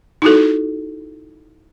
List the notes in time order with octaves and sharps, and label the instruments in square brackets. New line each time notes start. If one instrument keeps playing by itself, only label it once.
[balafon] D#4 E4 F#4 A4